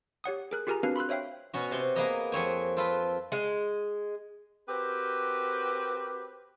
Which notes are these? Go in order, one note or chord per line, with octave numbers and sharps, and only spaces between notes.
G4 C#5 F#5 D#6
G#4 A#4 F#6
F4 G4 G#4 A#4 G#5 A#5
C4 D4 F#4 A#4 B4 F5
B5 C6 E6 F#6
C5 C#5 E5 F5 G5
B2 C#4 F#4
C3 C5 C6
A#3 B3 G#4 B4 D#5 A#5
F2 C4 C#5 G#5
C4 F4 A4 B4
G#3
C4 F#4 G4 A#4 B4